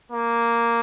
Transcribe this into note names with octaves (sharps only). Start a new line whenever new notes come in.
A#3